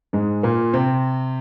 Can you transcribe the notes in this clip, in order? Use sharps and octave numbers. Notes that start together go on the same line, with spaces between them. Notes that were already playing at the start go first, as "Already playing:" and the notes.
G#2 G#3
A#2 A#3
C3 C4